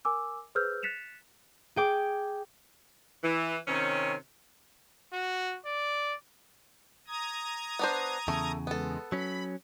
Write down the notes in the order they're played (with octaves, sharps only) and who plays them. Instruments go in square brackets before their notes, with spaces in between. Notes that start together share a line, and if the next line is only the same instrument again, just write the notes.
[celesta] A#4 G#5 D6 E6
G#4 B4 C5 E6 F6 G6
F#6 A6 B6 C#7 E7 F7
[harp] G#4 G5 D6
[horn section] E3
C3 D#3 C4 C#4
[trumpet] F#4
D5
[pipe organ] A#5 D#6 G#6
[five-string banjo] B3 D4 C5
[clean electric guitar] E2 C#3 [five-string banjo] A3
[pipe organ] G#3 [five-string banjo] B3 A4
[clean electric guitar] F#3 C#4 [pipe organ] B5